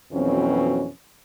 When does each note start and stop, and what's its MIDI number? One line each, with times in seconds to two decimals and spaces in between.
0.13 0.88 41
0.13 0.88 47
0.13 0.88 52
0.13 0.88 54
0.13 0.88 60
0.13 0.88 61